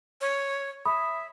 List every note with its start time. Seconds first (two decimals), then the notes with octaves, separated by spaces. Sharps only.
0.21 C#5
0.86 E5 B5 D#6